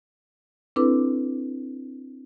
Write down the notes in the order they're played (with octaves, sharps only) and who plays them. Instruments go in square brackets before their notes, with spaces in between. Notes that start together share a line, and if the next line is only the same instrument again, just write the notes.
[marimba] C4 D4 E4 A4 B4 D6